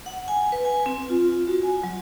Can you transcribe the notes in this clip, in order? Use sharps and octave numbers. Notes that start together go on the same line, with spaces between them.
F#5
G#5
B4
G#5
C4
F4
F#4
G#5
F#3